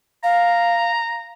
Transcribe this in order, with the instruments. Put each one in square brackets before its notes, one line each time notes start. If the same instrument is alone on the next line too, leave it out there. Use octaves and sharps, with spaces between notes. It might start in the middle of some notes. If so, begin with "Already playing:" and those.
[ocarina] F5 [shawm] A#5